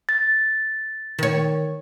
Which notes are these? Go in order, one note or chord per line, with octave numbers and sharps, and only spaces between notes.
A6
D#3 C#5